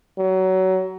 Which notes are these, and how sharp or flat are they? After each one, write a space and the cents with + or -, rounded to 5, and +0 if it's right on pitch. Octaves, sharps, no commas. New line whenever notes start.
F#3 +25